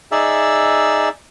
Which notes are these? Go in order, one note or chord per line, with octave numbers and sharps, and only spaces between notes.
D#4 G#4 D5 E5 E6